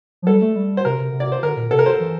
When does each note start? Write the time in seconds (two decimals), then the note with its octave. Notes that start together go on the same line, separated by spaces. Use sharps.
0.22 F3
0.27 G3 A4
0.42 A3
0.56 G3
0.77 C5
0.85 C3 A#4
1.00 C3
1.13 C3
1.20 D5
1.32 C5
1.43 D3 A#4
1.57 A#2
1.71 C3 A4
1.79 A#4
1.86 C5
2.00 E3